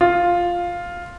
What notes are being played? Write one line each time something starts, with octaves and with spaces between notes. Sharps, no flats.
F4